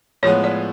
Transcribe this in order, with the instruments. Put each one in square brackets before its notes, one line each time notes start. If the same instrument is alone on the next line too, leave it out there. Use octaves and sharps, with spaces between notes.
[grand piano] A2 F3 G#3 B3 [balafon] C#5
[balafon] D5